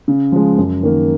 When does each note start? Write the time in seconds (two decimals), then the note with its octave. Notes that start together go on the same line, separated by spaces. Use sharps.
0.08 C#3
0.32 F3 G#3
0.58 F#2
0.83 D#3 A#3